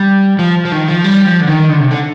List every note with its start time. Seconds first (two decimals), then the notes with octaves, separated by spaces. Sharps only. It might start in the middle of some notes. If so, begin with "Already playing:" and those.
Already playing: G3
0.39 F3
0.65 F3
0.72 D#3
0.88 F3
1.05 G3
1.26 F3
1.41 D3
1.48 D#3
1.70 D3
1.80 C3
1.91 D3